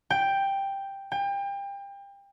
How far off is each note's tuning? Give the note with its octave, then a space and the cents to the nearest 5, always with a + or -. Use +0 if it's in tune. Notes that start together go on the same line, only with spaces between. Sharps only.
G5 +5
G5 +30